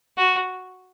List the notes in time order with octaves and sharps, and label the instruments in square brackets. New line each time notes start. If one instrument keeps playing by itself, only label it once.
[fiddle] F#4